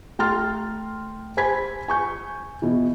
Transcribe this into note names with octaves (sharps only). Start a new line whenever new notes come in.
A3 G5 A#5 C6 F6 A6
C5 G#5 B5 G#6 B6
G#5 C#6 G6
B2 E3